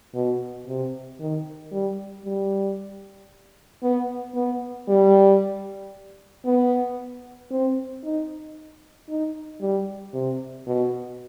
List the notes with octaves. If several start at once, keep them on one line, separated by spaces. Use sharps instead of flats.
B2
C3
D#3
G3
G3
B3
B3
G3
B3
C4
D#4
D#4
G3
C3
B2